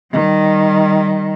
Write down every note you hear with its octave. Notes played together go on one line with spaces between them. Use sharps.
D#3 G3